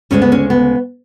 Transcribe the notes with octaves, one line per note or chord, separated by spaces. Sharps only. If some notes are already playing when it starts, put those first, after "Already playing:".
D2 C#3 G#3 C#4
B3
C#4
B3